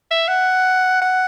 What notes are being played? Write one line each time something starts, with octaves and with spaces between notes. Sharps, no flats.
E5
F#5
F#5